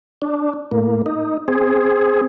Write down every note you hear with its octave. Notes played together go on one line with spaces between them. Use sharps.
D4
A2 A#3
D#4
C4 G#4